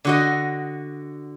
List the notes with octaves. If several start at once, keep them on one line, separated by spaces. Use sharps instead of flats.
D3 F#4 D#5